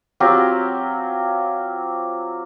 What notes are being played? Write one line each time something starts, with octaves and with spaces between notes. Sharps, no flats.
F#3 C4 F4 G4